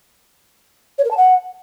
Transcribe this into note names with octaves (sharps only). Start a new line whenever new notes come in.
C#5
A#4
A5
F#5